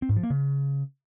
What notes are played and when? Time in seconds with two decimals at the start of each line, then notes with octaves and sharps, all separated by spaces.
0.02 C4
0.09 G#2
0.16 F3
0.23 A#3
0.30 C#3